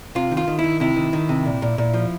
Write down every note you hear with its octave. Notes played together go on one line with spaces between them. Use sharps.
C3 F4
D#3
F4
D#3
E4
D#3
C3 E4
D#3
D#3
C3
A#2
A#2
A#2
F3